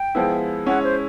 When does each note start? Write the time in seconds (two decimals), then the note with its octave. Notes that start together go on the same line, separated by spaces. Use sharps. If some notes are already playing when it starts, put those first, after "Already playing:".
Already playing: G5
0.15 F3 G#3 B3 E4
0.66 G#3 C#4 E4 F#5
0.84 C5